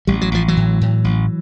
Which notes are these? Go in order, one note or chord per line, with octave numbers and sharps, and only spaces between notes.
A1 G3
F#3
A1 F3
E3 F#3
A2
A2
A1